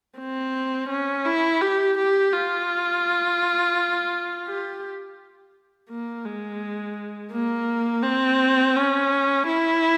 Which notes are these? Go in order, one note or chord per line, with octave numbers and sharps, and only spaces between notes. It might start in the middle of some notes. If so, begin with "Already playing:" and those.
C4
C#4
E4
G4
G4
F4
G4
A#3
G#3
A#3
C4
C#4
E4